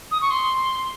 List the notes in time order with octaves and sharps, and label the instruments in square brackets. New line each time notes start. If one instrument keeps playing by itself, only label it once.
[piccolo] D#6
C#6
C6